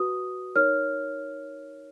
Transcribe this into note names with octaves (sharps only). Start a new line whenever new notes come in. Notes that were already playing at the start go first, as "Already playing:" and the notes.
Already playing: F#4 B4 D#6
D#4 A#4 C#5 F6